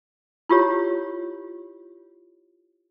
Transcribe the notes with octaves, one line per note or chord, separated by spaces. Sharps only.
E4 F4 G4 C#5